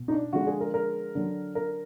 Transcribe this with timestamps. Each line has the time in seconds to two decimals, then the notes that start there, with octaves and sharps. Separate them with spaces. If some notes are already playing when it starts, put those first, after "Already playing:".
Already playing: B2
0.08 D#4
0.12 D4
0.33 D3 F3 G#3 F#4
0.47 G#4
0.61 A#4
0.74 A#4
1.15 D3 F#3
1.55 A#4